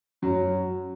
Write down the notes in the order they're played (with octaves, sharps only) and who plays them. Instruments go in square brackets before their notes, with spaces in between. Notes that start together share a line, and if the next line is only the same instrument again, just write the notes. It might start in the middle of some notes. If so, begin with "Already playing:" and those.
[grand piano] F#2 F#3